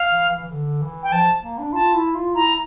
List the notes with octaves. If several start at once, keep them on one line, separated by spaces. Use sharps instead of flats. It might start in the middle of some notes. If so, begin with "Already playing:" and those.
Already playing: F5
E3
E3
E3
D3
E3
G5
F3 A5
A#3
D4
F4 A5
E4
F4
E4 A#5